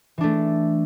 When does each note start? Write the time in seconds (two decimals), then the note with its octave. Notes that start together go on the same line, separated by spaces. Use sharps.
0.18 E3
0.21 D4
0.23 A3